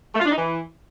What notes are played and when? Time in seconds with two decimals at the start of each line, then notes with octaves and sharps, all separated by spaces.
0.14 A3
0.20 F4
0.26 D4
0.31 D#4
0.37 E3